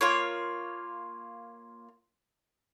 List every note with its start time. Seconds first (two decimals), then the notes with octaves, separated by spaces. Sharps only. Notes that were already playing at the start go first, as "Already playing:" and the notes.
0.01 A#3 F4 C#5